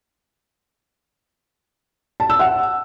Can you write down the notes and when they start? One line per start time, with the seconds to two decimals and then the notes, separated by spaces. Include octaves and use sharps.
2.20 A5
2.30 E6
2.39 F#5